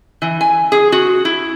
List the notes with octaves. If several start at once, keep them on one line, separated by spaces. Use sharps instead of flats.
E3
G#5
G#4
F#4
E4